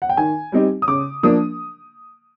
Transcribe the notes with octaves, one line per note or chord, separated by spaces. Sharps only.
F#5
G5
D#3 G#5
G3 C4 D#4 G4
D#6
C#3 D6
F3 A#3 D4 D#6